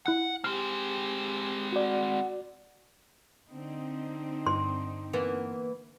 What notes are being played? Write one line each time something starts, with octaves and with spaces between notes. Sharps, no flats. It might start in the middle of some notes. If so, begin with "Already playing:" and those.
E4 F#5 F#6 C#7
G#3 C4 G4 F6
F#4 D5 F#5
D3 C4 D#4
G2 C6
E3 A#3 B3